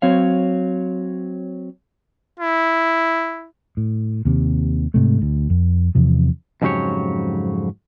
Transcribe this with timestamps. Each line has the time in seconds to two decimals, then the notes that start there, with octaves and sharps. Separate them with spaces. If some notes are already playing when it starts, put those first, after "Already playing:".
0.02 F#3 C4 C#5 F5
2.39 E4
3.77 A2
4.25 D#2 C3
4.94 G#2 C3 A3
5.22 D2
5.50 F2
5.95 E2 C3 F3
6.62 F2 G#2 C#3 F#3 G4 C#5